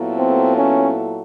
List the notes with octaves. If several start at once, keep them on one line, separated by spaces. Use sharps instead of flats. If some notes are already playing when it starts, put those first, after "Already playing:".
Already playing: A#2 F#3 B3 E4 A4
C4
C#4